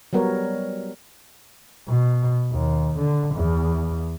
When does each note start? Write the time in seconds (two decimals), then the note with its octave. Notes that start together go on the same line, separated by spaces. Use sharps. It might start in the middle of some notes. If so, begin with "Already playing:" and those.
0.13 F#3 G3 B3 A#4 C#5
1.88 B2
2.52 D#2
2.98 D3
3.35 E2